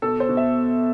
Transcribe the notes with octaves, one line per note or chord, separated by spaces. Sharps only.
B2 A4
C5
B2
E5